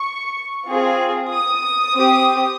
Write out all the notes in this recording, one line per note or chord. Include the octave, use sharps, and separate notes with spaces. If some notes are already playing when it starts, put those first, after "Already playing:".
Already playing: C#6
C4 F4 G#4
D#6
C4 G4